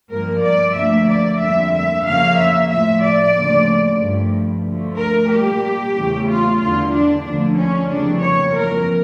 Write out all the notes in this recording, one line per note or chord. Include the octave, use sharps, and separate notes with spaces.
G2 F3 A#3 A#4
D5
D2 D3 F3 A#3 E5
D5
F2 D3 G3 A#3 E5
E5
F2 C#3 F3 A#3 F5
E5
A2 F3 A3 E5
D5
D2 C#3 F3 A#3
G2 F3 A3
D2 D3 F3 A3
A#4
A#2 G3 A#3 G4
E2 C#3 E3 A3
F4
E2 D3 G3 F4
D4
D2 D3 F3 A#3 D4
C#4
F2 C#3 E3 G3 A#3 D4
C#5
F2 E3 A#3 A#4